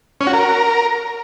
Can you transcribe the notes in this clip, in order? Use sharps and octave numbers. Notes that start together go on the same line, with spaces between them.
C#4
F#4
A#4